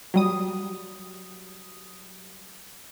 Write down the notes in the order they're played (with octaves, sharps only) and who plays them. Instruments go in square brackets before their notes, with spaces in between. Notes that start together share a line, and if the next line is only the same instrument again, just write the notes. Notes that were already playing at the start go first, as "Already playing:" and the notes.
[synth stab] F#3 G3 D#6